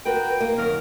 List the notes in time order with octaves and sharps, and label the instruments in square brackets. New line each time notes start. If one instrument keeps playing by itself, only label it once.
[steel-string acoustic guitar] F#4 A#4 B4 [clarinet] G5
[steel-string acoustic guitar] A#3
[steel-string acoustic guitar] F#2 D#3 [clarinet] A#4